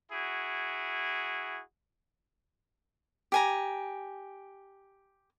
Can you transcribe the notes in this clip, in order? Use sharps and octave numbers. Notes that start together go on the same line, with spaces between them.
E4 F#4 G#4
G4 G#5 A#5